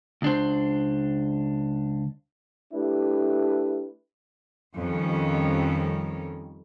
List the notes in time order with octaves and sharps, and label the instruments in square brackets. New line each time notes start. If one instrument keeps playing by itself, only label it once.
[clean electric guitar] C#2 D4 C5
[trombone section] A3 D4 E4 G4 B4
[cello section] F2 D#3 G3 C#4